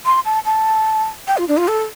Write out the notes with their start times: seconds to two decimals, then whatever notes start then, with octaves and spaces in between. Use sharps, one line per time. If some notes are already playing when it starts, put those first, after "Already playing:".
0.06 C6
0.25 A5
0.45 A5
1.27 G5
1.37 F4
1.48 D4
1.57 F4
1.68 A4